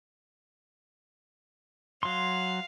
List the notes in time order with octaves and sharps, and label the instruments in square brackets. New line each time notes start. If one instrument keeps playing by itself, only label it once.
[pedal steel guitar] F#3 C6 [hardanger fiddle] F5